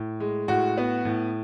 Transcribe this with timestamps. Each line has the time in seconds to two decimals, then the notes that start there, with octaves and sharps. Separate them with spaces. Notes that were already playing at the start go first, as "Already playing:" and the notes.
Already playing: A2
0.20 G#3
0.48 A2 F#4
0.77 B3
1.05 A2